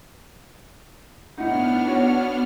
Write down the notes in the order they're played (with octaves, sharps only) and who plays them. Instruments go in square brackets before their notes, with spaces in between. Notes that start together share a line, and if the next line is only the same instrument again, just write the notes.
[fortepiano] A2 D#4 [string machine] B3 D4 F6 [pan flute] F#5
[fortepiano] F#4 C#5